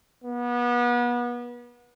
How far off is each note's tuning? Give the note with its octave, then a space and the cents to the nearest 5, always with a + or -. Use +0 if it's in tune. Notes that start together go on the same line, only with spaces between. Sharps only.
B3 -30